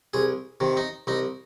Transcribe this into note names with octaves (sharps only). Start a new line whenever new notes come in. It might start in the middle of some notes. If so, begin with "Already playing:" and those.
C2 G#4
C3 D#3
D#4
C2 D#4